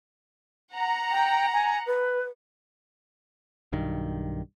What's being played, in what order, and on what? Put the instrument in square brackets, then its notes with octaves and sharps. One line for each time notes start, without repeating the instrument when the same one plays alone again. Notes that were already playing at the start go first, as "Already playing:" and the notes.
[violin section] F#5 A#5
[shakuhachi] G5
G#5
B4
[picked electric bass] B1 G2 D#3